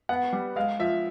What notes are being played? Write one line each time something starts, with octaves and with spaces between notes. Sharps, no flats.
B3 F#5
G3
G#3 F5
F3 E5